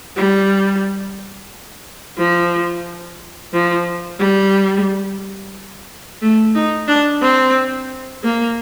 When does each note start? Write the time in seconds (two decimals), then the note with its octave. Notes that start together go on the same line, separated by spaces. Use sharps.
0.16 G3
2.18 F3
3.53 F3
4.19 G3
6.22 A3
6.55 D#4
6.88 D4
7.22 C4
8.24 A#3